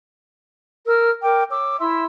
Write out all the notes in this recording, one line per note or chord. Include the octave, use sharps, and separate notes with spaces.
A#4 E6 F6
A#4 G5 D6
C#5 D6 E6
E4 E5 C6 E6